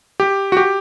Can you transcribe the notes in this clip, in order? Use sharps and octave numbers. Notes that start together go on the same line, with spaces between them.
G4
F#4
G4